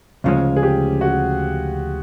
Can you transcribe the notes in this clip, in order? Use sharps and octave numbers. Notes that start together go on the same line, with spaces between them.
D2 C#3 F3 G#3 C#4 F4
G#4
G4
F#4